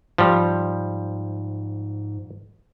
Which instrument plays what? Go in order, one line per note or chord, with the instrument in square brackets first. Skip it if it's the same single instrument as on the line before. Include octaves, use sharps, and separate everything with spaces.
[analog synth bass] G#2 [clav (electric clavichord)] F3 G3